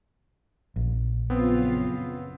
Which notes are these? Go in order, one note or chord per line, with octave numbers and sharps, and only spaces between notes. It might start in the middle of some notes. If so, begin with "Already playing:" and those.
A#1
F#2 C#3 B3 C4 F4